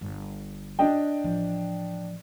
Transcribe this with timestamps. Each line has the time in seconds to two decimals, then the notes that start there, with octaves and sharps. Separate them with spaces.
0.01 G1
0.79 D4 D#5 G5
1.24 A1 F3